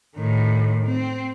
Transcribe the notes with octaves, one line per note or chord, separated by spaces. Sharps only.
A2 D#3
C4